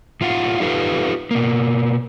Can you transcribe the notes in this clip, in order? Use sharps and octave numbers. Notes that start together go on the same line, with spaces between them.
A2 F4 F5 F#5
D#4 F4 G4 A4 B4 F5
B2 A#3